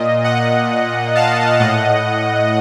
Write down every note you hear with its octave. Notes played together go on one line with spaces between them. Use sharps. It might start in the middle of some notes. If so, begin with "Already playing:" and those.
Already playing: A#2 D#5
D#5 F#5
F5 A5
A2 D#5 F#5